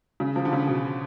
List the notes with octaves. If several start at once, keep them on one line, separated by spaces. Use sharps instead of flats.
C#3
F3
D3
C#3
B2